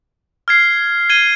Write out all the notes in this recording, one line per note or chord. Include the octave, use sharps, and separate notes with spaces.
F6 G#6 C7
G#6 D#7 G7